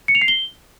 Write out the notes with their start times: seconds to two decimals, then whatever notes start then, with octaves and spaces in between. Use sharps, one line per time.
0.08 C#7
0.15 F7
0.22 C7
0.28 G7